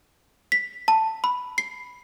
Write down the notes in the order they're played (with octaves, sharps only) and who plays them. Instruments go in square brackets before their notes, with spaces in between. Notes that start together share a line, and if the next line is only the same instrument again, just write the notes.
[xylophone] B6
A5
B5
C7